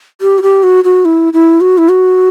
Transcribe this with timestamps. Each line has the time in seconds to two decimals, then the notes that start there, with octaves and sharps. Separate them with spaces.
0.21 G4
0.38 F#4
0.42 G4
0.63 F#4
0.84 F#4
1.05 E4
1.33 E4
1.61 F#4
1.78 E4
1.89 F#4